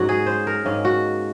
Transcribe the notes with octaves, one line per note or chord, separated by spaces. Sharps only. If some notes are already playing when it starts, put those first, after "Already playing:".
Already playing: G#2 F#3 C#4 F#4 A#4
G#4
C5
A#4
G#2 D#3 A#3 C#4
F#4